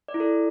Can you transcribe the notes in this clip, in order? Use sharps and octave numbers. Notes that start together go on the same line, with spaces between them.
D5
E4
A4